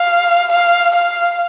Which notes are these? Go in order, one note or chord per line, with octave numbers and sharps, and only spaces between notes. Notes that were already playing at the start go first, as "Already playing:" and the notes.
Already playing: F5
F5
F5